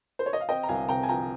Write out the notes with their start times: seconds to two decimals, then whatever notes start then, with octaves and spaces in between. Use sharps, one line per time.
0.19 C5
0.26 C#5
0.33 D#5
0.41 F5
0.49 C4 D#5 G5
0.63 A#5
0.68 C2 F5 G#5
0.89 C3 G5 A#5
1.03 G#5
1.09 F3 G5 A#5